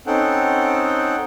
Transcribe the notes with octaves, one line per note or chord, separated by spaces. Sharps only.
C4 C#4 D#4 A4 F#5 G5